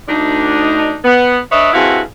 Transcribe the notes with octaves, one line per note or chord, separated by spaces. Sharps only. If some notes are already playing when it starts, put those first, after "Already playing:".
D2 D4 D#4
B3
D4 B4 C#5 D#5 E5
G2 C4 E4 F#4 G#4 F5